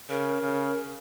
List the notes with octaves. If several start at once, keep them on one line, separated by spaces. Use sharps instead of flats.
C#3 A#4
C#3